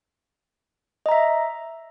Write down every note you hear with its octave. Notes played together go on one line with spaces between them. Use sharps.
D#5 E5 A#5